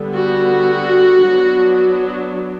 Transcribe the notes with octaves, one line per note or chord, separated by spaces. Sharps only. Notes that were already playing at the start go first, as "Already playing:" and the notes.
Already playing: D3 G3 B3
F#4
F#3 B3 D4